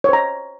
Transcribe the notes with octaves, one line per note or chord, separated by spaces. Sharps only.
C5 C#5 A#5